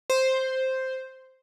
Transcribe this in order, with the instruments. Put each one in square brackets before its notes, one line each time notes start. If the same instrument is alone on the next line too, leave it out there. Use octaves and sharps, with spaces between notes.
[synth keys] C5